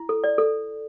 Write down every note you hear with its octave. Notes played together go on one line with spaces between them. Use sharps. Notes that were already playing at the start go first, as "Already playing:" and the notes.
Already playing: E4
A4
D5
A4